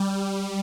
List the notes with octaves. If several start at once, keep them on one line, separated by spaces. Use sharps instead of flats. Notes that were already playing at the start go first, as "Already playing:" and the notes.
Already playing: G3